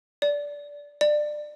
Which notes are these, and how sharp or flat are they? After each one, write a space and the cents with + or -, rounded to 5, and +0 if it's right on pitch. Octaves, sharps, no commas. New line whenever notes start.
D5 -15
D5 +20